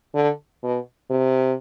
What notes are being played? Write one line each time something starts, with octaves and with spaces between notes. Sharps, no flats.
D3
B2
C3